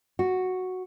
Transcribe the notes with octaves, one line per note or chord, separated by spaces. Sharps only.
F#4